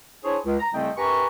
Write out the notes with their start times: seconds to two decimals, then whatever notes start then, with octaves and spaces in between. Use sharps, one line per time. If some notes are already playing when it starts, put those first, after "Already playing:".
0.24 D4 E4 G#4 C5 C#5
0.45 C#2
0.59 A#5
0.73 C2 C#3 A3 C4 D#5 G5
0.97 F#2 G4 B4 G#5 A#5 C#6